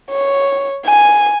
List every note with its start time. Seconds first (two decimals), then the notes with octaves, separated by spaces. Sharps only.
0.11 C#5
0.85 G#5